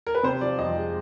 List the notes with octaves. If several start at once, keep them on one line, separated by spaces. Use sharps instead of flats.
A#4
B4
C3 C5
F3 D5
F2 D#5
G#3